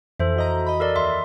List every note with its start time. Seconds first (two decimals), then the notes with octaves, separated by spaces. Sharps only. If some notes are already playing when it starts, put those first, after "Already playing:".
0.20 F2 E3 A4 C5 E5
0.36 F#4 D#5 A#5
0.67 D#5 B5
0.80 A4 A#4 D5 E5
0.96 D#2 E5 C6